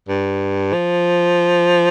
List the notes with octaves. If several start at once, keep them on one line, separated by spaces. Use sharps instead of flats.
G2
F3